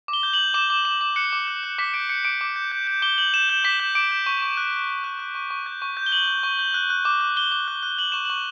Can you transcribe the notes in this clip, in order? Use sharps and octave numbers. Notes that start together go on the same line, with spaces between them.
D6
G7
G6
F#7
G6
D6 E7
D6
D6
D6
F#6 C#7
D6
F#6
F#6
D6 B6
G6 D7
G6 C#7
D6 D7
D6
G6
G6
G6
D6 G7
G6 F#7
G6 E7
G6
D6 B6
G6
D6 D7
G6
C#6
C#6
F#6
F#6
F#6
F#6
F#6
C#6
C#6
G6
C#6
G6
G7
G6 F#7
G6
C#6
G6
F#6
F#6
D6
F#6
D6 G7
D6
F#6
F#6
G6 F#7
C#6 E7
C#6 F#7